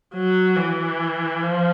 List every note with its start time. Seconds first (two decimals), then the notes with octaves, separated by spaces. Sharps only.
0.14 F#3
0.56 E3
1.42 F3